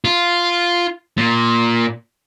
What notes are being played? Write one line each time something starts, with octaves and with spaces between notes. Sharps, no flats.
F4
A#2